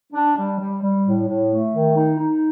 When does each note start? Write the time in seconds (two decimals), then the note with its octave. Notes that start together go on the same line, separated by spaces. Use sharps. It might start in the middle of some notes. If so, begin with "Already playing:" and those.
0.13 D4
0.37 G3
0.59 G3
0.82 G3
1.05 A2
1.27 A2
1.51 A3
1.73 D#3
1.96 D#4
2.18 D#4